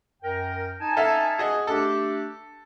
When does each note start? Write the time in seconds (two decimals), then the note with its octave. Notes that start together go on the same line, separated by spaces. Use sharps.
0.23 F#2 A#4 G5
0.80 D#4 G#5 A5
0.97 A4 E5 F5
1.39 F#4 G#4 D#5
1.67 A3 D4 G4 A4